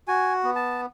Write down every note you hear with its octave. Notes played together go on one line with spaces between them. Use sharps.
F#4 G#5
B3
A5